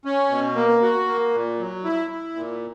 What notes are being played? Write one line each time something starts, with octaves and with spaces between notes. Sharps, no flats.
C#4
B2
A#3
F#4
A#3
A#2
F#3
E4
E4
A#2